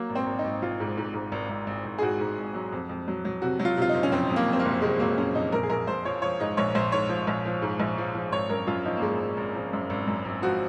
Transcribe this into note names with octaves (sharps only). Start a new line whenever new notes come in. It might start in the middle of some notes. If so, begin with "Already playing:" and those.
Already playing: F#3 A#3
G#1
C4
G#1
D#4
G#1
G#1 F4
G#2
G#2
G#2
G#1
G#1
G#1
G#1
G#4
G#2 F#4
G#2
G#1
F#3
F2
F2
F#3
F#3
C3 F#4
F#3
F4
C3 F4
D#4
F#1
C#4
F2 C4
F2
A#3
F2
C4
A#3
F#1
C3 G#3
F#3 A#3
F#1 C#4
F2 D#4
A#1 A#4
G#4
A#1 A#4
A#1 C5
F3 C#5
F3 C#5
G#2 D#5
A#1 C#5
A#1 C5
G#2 C#5
F3
A#1
F3
G#2
A#1
F3
F3
G#1 C#5
F#2 A#4
F#2 F4
F3 D#4
A#3
G#1 G#3
G#1
G#1
F3
F#2
G#1
F#2
G#1
F3 F#4